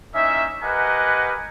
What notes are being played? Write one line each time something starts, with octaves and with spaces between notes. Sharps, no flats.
A#3 C#4 D#4 E4 E5
G4 A#4 B4 D#5 F#5 G#5